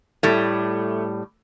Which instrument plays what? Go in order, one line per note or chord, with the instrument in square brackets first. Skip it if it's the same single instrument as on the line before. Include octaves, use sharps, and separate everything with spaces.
[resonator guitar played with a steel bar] A2 G3 [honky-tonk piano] A3